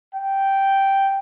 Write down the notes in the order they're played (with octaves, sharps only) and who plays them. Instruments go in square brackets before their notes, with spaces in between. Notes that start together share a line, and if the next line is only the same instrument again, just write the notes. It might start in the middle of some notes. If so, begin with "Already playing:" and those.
[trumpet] G5